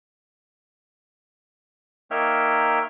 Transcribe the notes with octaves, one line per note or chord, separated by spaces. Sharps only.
A#3 D#4 C#5 E5 G5 F6